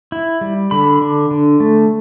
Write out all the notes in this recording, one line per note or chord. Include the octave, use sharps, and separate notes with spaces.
E4
G3
D3 B5
D4
D3
A3